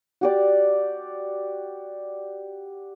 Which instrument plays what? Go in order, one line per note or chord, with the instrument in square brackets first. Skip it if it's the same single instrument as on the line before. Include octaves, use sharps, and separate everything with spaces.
[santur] F#4 G4 D5